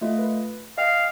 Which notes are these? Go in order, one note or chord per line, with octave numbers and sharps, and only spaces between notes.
A3 F4 D#5
B4
D#5 F5 G5